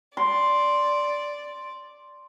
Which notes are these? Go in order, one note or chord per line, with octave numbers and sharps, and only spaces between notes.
D5 C6